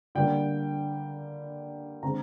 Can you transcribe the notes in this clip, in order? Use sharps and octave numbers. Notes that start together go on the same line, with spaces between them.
D3 G3 A#3 G5
D3 G#3 C4 A#5